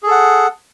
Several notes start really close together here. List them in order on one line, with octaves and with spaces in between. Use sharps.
G#4 A4 F#5